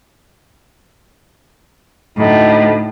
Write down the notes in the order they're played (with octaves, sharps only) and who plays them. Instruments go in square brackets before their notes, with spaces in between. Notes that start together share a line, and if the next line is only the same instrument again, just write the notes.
[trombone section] D2 D#4 [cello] A2